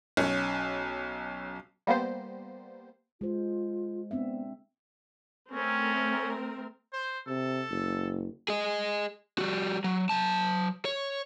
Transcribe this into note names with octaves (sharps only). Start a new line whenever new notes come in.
B1 C#4
G3 A#3 B3 C5
G#3 F4 C5
B3 C4 D4 E5
A3 C4 C#4 A#4
C5
C3 A4
F#1
G#4 D#5
G3 F#4
F#3
F#3 A5
C#5